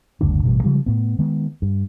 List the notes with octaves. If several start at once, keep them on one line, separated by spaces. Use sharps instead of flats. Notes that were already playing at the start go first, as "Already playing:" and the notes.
F#1 D2 G2 D4
A1 G2 B2
C#3 F3 G3 G#3
A2 B3
D#3 G#3 B3
G2